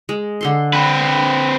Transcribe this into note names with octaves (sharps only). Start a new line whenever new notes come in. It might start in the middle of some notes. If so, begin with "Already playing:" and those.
G#3
D3 A4 C6
C4 B4